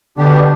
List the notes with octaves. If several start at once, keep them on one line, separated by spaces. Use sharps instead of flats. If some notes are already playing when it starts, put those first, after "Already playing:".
B2 D3 G3 B3 D4 G4